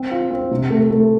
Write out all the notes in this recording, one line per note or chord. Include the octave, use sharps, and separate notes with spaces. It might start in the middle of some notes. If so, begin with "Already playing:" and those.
Already playing: C4
F4
C4
C3
A3
A3